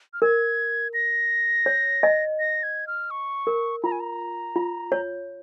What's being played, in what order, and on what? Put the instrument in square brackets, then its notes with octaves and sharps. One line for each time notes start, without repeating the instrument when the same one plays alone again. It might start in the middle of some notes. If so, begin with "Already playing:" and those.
[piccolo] F6
[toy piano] A#4 [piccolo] G#6
[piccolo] A#6
[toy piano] C#5
D#5
[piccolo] A#6
G#6
F6
C#6
[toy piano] A#4
[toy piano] F4 [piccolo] A#5
[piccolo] G#5
A#5
[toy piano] F4
C#5